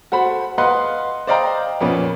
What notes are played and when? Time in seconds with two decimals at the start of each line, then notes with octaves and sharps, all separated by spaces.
0.12 F#4 A4 C5 B5
0.58 B4 D#5 F5 F#5 C6 F#6
1.27 C5 D5 D#5 F5 G5 A#5
1.81 F2 A#2 B3 C#4